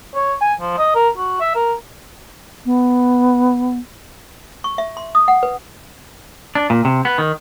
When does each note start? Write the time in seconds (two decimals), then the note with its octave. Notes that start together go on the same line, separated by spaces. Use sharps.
0.15 C#5
0.41 G#5
0.61 F3
0.78 D#5
0.95 A#4
1.17 F#4
1.41 E5
1.55 A#4
2.65 B3
4.64 C#6
4.78 E5
4.97 C6
5.15 D#6
5.28 F#5
5.43 B4
6.55 D4
6.70 A#2
6.85 C3
7.05 B3
7.18 D#3